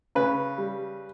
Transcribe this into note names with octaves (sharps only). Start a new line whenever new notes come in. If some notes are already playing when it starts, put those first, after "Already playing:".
C#3 B4
G3